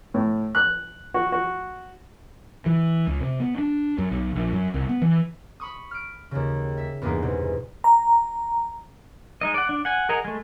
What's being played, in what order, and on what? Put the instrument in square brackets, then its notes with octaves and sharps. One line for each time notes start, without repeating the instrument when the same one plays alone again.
[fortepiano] A2
F#6
F#4
F#4
[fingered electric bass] E3
C#2
C3
B3
D4
F#2
B1
A#1
F#2
C2
B3
E3
[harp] B5 C#6 D#6
F6 D7
D#2 C#3
E5
E2 G2 G#3 A#3 B3 D#4
C2 B2
[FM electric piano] A#5
[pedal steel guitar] G#3 D#4 D#5
D5 F#5
D4
F#5 G#5
G#4 A#4 D#5 F#5 A#5
G#3 A3